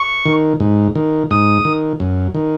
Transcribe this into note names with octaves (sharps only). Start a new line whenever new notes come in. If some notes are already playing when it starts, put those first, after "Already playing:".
Already playing: C#6
D#3
G#2
D#3
G#2 D#6
D#3
F#2
D#3